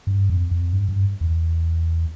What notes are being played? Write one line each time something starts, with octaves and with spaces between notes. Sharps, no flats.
G2
F2
F2
G2
G2
E2